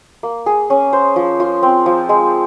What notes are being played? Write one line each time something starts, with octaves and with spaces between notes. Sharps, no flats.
A#3
G#4
C#4
C5
F3
F4
C4
F3
G#3